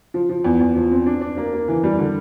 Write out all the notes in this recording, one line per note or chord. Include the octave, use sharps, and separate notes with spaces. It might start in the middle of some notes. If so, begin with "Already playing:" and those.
F3
F3
E2
E2
F3
C4
D4
D4
A#3
A#3
E3
G3
D3